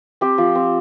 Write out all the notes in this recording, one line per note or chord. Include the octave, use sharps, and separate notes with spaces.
C4 G4
F3
C4